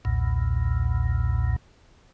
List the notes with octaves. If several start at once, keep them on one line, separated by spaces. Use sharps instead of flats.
B1 E2 A#2